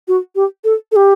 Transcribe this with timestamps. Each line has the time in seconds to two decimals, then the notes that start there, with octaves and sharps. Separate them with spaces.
0.08 F#4
0.35 G4
0.64 A4
0.92 A4
0.96 G4